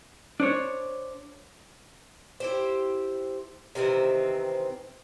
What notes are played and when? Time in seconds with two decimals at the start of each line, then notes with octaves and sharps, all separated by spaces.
0.40 D4 C5 C#5
2.40 E4 G4 C5
3.75 C3 D#3 E3 C4